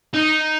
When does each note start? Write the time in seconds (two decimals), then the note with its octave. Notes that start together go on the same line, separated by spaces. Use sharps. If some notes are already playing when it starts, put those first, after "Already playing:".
0.14 D#4